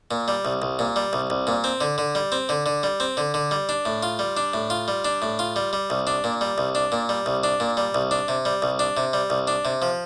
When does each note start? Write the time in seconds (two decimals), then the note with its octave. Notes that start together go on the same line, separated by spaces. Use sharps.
0.11 A#2
0.28 G3
0.45 C2
0.62 C2
0.79 A#2
0.96 G3
1.13 C2
1.30 C2
1.47 A#2
1.64 C4
1.81 D3
1.98 D3
2.15 G3
2.32 C4
2.49 D3
2.66 D3
2.83 G3
3.00 C4
3.17 D3
3.34 D3
3.51 G3
3.69 D4
3.85 A2
4.03 F4
4.19 G3
4.37 D4
4.54 A2
4.70 F4
4.88 G3
5.05 D4
5.22 A2
5.39 F4
5.56 G3
5.73 G3
5.90 C2
6.07 D4
6.24 A#2
6.41 G3
6.58 C2
6.75 D4
6.92 A#2
7.09 G3
7.26 C2
7.44 D4
7.60 A#2
7.77 G3
7.94 C2
8.11 D4
8.28 C3
8.45 G3
8.62 C2
8.79 D4
8.97 C3
9.13 G3
9.30 C2
9.48 D4
9.65 C3
9.82 F3